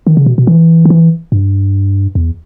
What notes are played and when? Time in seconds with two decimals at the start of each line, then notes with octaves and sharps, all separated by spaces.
0.07 D#3
0.17 C#3
0.26 B2
0.38 B2
0.47 E3
0.85 D#3
0.90 E3
1.32 G2
2.15 E2